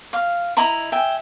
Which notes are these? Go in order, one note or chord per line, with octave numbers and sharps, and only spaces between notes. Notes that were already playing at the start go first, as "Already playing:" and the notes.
F5
E4 D#5 A#5 B5
E5 G5 G#5